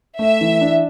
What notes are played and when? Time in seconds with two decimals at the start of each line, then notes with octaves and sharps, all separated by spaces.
0.19 A3 E5
0.41 E3
0.61 D4